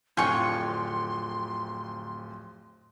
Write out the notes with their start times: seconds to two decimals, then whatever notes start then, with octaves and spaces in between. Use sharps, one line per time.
0.17 D1 F2 D3 F4 G5 G#5 C6 C#6